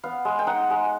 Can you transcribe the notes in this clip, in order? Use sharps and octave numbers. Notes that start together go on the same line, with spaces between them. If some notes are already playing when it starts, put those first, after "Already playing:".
B3 F5
G#3
G5
D#4 F#5
G#3